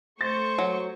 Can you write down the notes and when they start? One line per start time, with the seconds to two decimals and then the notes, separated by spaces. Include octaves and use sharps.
0.21 A3 C5 C#6 A6
0.58 F#3